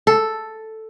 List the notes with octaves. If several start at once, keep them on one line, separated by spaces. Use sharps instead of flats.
A4